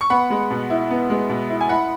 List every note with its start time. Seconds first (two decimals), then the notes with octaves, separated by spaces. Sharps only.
0.01 C#6
0.10 B3 F#5 B5
0.30 G#3
0.50 B2
0.70 E4
0.90 B3
1.10 G#3
1.29 B2
1.50 E4
1.61 G#5
1.69 E4 F#5 B5